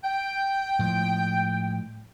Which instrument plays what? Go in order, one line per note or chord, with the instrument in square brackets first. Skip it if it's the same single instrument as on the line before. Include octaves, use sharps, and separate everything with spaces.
[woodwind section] G5
[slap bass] A2 F3 G#3